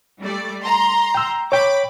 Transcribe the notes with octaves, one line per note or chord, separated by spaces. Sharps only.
G3 A3 D5
A#5 C6
G5 E6
C#5 G5 B5 D6